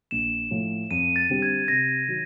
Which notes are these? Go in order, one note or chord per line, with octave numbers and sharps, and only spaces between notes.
A#1 E7
A2 F3 A3
F2 D#7
A6
D3 G3 C4
G#6
C3 A#6
D#3 F#3